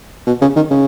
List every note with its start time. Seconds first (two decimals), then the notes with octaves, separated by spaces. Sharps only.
0.27 B2
0.42 C#3
0.56 D#3
0.71 C#3